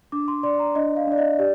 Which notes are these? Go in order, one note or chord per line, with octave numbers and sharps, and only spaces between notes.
D4 D6
C6
D5 C6
A#5
D4 D#5
F5
D4 D5
D#5
G4 D5